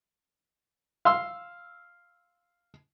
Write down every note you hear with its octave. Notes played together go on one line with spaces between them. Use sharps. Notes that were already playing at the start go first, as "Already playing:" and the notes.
F5 C6 E6